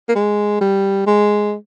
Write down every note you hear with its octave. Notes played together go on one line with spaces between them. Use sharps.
A#3
G#3
G3
G#3